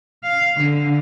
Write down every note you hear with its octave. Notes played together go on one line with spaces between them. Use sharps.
F5
D3